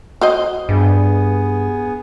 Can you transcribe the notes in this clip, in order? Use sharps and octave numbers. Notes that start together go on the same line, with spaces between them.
F#4 C5 D#5
G2 B3 G#4